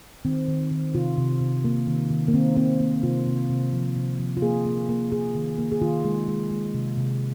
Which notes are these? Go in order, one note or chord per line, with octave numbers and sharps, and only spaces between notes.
D#3 C4
D#3
D#3
C3 F4
C3
C3
A#3
D#3
D#3
A#3
D#3 C4
A#3 C4
A#3
C3 F4
C3
C3
F3
C3
F3
F4
A#3 G#4
A#3
A#3
A#3 G#4
D#3
A#3
G#4
D#3 F4
G#3
G#3
G#3
C3
C3